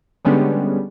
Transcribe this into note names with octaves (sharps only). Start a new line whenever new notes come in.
D3 G3 G#3 B3 C#4 D4